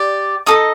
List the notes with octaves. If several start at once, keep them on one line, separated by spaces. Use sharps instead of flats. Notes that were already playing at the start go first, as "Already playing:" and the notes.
Already playing: G4 D5
D#4 A4 D#5 D#6